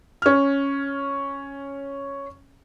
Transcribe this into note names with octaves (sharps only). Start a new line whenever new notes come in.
C#4 F6